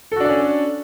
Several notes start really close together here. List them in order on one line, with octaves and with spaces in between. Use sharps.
A4 F#4 D4 D5 C#4